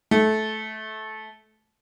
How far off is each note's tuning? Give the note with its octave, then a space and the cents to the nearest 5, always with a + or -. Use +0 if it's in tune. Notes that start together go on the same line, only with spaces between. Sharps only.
A3 -20